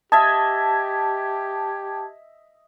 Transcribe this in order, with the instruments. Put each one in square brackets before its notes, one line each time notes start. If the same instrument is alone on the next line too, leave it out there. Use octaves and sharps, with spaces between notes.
[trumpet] G4 [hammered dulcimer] D#5 E5 [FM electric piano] A5 G#6